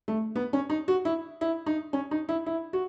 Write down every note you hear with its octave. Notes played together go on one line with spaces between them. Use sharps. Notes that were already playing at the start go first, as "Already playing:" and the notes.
A3
B3
C#4
D#4
F#4
E4
E4
D#4
C#4
D#4
E4
E4
F#4